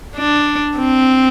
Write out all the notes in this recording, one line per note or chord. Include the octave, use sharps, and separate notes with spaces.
D4
C4